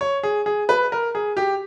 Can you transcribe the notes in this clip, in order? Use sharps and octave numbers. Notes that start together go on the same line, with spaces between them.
C#5
G#4
G#4
B4
A#4
G#4
G4